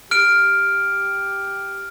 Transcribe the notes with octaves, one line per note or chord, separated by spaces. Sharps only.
G4 F6 D7